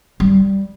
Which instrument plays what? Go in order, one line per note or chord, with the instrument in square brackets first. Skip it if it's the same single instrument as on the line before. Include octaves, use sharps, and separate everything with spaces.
[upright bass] G3